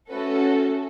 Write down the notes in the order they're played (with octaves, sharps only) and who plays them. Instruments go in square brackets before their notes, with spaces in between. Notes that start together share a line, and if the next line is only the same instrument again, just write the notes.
[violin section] A3 C#4 F#4 A4 B4